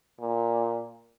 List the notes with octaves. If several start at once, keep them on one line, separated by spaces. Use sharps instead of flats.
A#2